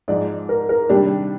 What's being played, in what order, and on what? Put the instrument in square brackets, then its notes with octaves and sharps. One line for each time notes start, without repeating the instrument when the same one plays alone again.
[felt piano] G#2 F3 G#3 D#4 [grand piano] D5
[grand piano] A#4
A#4
[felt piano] C3 D#3 G3 D4 [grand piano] G4